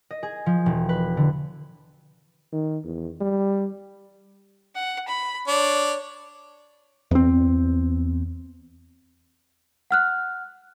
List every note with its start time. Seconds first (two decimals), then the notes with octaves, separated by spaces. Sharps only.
0.11 D#5
0.23 G#4
0.46 F3
0.66 E1
0.89 B4
1.17 D3
2.53 D#3
2.84 E2
3.21 G3
4.75 F#5
5.08 B5
5.47 D4 C#5
7.11 E2 C4
9.91 F#5 F6 F#6